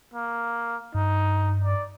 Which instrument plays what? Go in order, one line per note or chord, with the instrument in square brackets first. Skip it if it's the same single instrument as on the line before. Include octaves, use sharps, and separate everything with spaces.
[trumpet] A#3
[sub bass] G2 [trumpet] D#4
[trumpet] D5